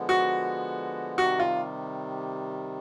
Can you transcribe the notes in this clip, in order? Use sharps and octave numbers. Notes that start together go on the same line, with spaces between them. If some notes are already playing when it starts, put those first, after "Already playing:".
Already playing: D3 F3 G#3 B3
F#4
C3 D#3 G3 F#4
F4